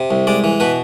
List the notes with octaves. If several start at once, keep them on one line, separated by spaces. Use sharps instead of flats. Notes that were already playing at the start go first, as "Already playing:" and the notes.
Already playing: C3
C2
G#3 D5
E3
B2 B4